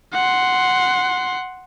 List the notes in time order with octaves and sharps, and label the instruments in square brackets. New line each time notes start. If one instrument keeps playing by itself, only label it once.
[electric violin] F#5 C6